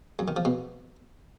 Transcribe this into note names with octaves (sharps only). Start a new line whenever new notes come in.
F#2
D#3
F3
B2